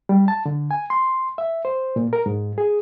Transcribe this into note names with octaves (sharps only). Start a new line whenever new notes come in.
G3
A5
D3
G#5
C6
E5
C5
A#2
A#4
G#2
G#4